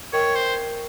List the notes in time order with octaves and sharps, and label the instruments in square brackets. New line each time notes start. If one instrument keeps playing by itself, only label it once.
[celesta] A#4 D#5 G5 C#6 [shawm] C#5
[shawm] C5